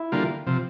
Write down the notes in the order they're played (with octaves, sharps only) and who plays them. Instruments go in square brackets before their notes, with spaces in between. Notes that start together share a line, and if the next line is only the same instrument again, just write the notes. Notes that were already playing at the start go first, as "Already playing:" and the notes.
Already playing: [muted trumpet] E4
[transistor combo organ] D3 G3 A#3 F4
C3 F3